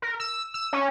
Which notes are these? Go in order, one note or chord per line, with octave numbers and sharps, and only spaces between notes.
A#4
E6
E6
C#4